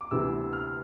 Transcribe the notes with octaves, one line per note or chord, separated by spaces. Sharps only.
D6
D2 C3 E3 B3 E6
F6